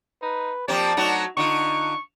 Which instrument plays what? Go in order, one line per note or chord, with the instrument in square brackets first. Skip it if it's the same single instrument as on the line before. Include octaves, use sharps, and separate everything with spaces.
[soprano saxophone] D#4 [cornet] B4
[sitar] F3 A#3 C4 [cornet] G4 [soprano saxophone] D5
[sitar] F#3 A3 D#4 [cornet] F#4
[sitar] D3 F4 [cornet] D#4 [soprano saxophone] C#6